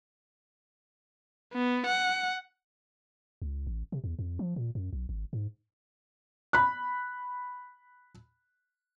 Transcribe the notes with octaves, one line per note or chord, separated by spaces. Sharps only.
B3
F#5
C#2
A1
C3
E2
F2
F3
A#2
F#2
B1
G#1
G#2
B5 F#6